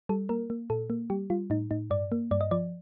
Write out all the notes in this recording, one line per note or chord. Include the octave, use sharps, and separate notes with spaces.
G3 A4
A#3 A#4
A#3
A#2 A4
A#3
G3 G4
G3 F4
A2 D#4
A2 D#4
G2 D5
A#3
G2 D5
D#5
F3 D5